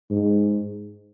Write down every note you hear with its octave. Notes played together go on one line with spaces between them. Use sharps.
G#2